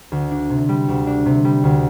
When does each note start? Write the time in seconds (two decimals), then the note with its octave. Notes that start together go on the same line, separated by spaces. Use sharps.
0.12 D2
0.31 D4
0.50 C3
0.69 G3
0.88 D2
1.07 D4
1.26 C3
1.45 G3
1.64 D2